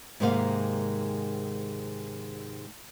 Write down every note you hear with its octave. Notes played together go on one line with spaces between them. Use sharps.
G#2 C3 D#3 G#3 A#3 F5